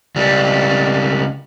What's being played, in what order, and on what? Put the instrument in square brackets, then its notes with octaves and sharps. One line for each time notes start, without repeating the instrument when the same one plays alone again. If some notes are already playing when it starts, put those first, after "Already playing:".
[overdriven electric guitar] C#2 G3